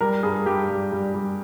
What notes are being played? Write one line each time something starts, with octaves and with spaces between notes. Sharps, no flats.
G3 A#4
G2 G#4
G2 G4
G3
G3
G3